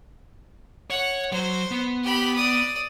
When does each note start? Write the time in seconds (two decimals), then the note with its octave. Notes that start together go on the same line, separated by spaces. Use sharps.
0.90 C#5 F#5
1.32 F#3 C5
1.71 B3
2.03 G4 B5
2.36 D5 D#6